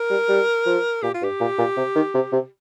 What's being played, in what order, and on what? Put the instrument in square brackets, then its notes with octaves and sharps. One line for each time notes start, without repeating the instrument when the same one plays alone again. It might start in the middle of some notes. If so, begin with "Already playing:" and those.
Already playing: [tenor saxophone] A#4
[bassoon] G3
G3
F3
[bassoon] A#2 [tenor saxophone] G4
[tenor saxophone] F4
[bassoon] G2 [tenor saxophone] G4
[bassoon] A#2
A#2
C3
D#3
C3
C3